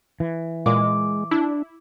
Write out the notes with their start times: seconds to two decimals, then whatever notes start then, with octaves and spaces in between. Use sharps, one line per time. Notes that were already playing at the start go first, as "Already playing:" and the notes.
0.20 E3
0.66 A#2 G#3 D6
1.31 D4 E4